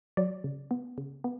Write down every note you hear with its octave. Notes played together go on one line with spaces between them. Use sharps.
F#3 D5
C#3
B3
C#3
B3